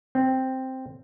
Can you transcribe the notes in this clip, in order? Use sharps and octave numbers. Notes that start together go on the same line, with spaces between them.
C4